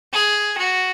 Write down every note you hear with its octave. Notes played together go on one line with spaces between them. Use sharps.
G#4
F#4